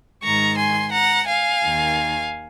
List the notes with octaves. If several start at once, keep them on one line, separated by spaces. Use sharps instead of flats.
G#2 D#3 A#5 C#6
G#5 C6
F#5 A#5
F5 G#5
D#2 D#3